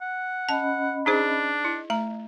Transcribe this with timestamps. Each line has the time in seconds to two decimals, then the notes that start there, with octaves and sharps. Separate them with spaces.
0.02 F#5
0.49 C#4 D#5 A5 B5
1.06 D4 D#4 G#4 C5
1.65 E4 D#5
1.90 A3 A#5